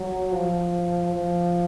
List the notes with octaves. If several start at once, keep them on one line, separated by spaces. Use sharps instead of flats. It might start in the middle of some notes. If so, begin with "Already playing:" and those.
Already playing: F#3
F3
F3